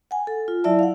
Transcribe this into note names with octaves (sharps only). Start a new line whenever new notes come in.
F#5 G#5
A4
F4
F#3 E4 D5 E5 A5
F5 F#5